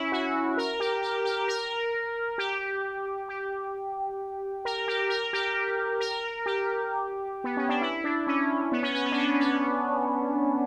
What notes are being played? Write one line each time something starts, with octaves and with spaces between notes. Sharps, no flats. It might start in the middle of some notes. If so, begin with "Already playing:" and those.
Already playing: C#4 E4
F#4
A#4
G4
G4
G4
A#4
G4
G4
A#4
G4
A#4
G4
A#4
G4
B3
C#4
D4
E4
D4
C#4
B3
C#4
C#4
B3
D4
C#4
B3